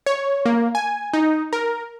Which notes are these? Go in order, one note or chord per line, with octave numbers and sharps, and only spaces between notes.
C#5
A#3
G#5
D#4
A#4